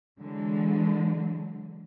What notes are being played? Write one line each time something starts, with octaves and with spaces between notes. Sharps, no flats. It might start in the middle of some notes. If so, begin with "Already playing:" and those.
D3 E3 F#3 G#3